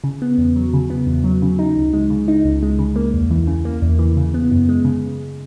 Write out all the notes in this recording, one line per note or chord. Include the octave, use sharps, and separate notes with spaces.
C#3
B3
E2
F#3
C#3
B3
E2
F#3
C#3
D#4
C#2
G#3
C#3
D#4
C#2
G#3
C#3
A#3
E2
E3
C#3
A#3
E2
E3
C#3
B3
F#2
G#3
C#3